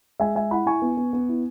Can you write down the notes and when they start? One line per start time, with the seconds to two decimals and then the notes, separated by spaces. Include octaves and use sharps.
0.20 G#3 E5 G#5
0.36 G#3 E5 G#5
0.51 E4 F#5 B5
0.66 E4 G#5 C#6
0.82 B3
0.97 B3
1.13 B3
1.29 E4